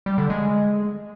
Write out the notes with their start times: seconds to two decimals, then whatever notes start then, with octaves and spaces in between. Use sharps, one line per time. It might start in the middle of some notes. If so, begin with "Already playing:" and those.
0.06 G3
0.18 D3
0.30 G#3